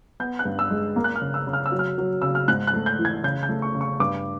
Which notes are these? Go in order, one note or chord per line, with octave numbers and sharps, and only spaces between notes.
B3 G6
F#6
G2
E6
G#3
A#3
F#6
F6
C#3
E6
C#3
F6
E6
F#3
F6
F#3
C#3 E6
F6
G#2 F#6
F#6
A3
G6
E3
G#6
C#3 G6
G6
A3
C#6
C#3
C#6
G2 D6